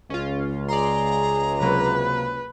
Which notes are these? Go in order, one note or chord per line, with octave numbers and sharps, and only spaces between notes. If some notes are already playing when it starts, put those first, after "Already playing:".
C#2 C#4 F4
G#4 D5 A#5 C6
C3 F#3 A#3 B4